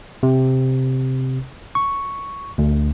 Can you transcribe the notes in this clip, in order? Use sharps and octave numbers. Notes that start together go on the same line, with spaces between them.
C3
C#6
D2